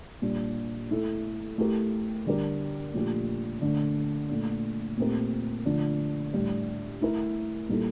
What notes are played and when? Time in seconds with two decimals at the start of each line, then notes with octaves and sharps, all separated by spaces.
0.22 A#2 G3 D4
0.91 A3 E4 A4
1.58 A3 E4 G4 A#4
2.26 D3 G3 D4 G4 A#4
2.94 A#2 F3 A3 D4 G4
3.62 D3 A3 D4
4.29 A#2 A3 D4
4.97 A#2 A3 C4 G4 A#4
5.66 D3 F3 A3 D4
6.33 A2 G3 D4
7.01 A3 E4 A#4
7.69 A#2 G3 A#3 E4 A4